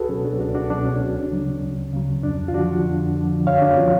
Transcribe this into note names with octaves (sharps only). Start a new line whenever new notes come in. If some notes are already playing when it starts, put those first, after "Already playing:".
Already playing: C#2 F#4 G#4 A4 B4
B2 F#3 C#4
D4
C#2 D4 F#4
D4 F#4
B2 F#3 D4
C#4
D2
C#3 F#3
D2
C#3 F#3
F2 D4
F4
D3 F3 D4 F#4
F2
D3 F3
F#2 C#5 F5
D4 F#4
D3 F3 C#4 F4